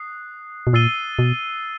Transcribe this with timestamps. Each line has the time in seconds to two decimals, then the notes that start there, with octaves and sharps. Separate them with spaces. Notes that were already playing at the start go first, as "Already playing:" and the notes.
Already playing: D#6 F#6 C7
0.67 B2
0.73 A#2 E6 A6 C7 D#7 G7
1.19 B2